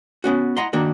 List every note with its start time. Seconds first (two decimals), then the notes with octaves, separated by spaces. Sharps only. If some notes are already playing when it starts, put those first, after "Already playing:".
0.24 B3 C#4 F#4
0.57 E4 D#5 F#5 A#5 C6
0.73 D#3 A#3 D4 F#4 A#4